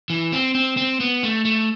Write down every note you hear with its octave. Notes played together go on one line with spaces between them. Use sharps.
E3
C4
C4
C4
B3
A3
A3